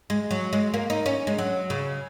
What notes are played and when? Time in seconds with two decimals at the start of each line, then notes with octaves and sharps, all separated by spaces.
0.10 G#3
0.31 F#3
0.53 G#3
0.74 A#3
0.90 D#4
1.06 C#4
1.27 G#3
1.38 F#3
1.70 C#3